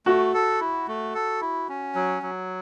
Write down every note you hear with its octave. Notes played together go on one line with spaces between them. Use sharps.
A3 F#4
A4
E4
A3
A4
E4
C#4
F#3
F#3